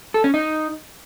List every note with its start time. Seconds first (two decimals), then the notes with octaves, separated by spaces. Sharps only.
0.14 A4
0.24 C#4
0.34 D#4